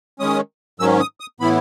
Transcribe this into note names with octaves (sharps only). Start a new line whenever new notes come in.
D#3 G#3 C#4 D#6
G#2 D#3 F#3 C#4 E6
D#6
D#6
A2 E3 B3 E4 B5